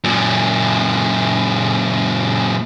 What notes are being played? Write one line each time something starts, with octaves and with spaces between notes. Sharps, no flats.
F#2 A#2